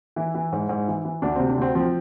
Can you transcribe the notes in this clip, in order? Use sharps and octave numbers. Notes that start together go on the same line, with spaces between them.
E3 E4
E3
G#2
G#2
E3
E3
D2 D4
C3 C4
D4
D2 C4
F3 C4